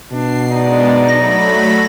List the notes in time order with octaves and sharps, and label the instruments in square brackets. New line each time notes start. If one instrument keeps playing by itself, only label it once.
[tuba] B2 [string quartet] D4 [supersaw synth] C7
[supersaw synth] G#3 B3 D4 [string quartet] D#4 D5
[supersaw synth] F#3 A3 B5 [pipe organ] A#6